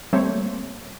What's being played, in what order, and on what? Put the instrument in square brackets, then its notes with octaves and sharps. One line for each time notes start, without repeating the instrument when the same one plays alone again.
[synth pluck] G3 A3 A#3 C4 C5 C#5